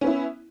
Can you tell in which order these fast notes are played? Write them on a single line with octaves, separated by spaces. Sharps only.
C#4 B3 E4